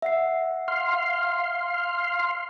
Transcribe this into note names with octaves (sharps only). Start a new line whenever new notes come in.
E5 F#5 C7
F5 C6